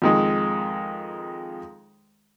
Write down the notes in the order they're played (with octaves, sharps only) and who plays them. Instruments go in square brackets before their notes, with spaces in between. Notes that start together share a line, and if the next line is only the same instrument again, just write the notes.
[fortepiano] F2 D#3 G#3